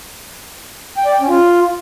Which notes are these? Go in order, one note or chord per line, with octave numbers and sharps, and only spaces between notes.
G5
D5
G5
C#4
F4